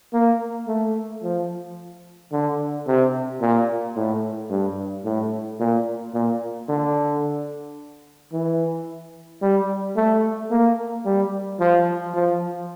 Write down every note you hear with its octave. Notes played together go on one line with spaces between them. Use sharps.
A#3
A3
F3
D3
C3
A#2
A2
G2
A2
A#2
A#2
D3
E3
G3
A3
A#3
G3
F3
F3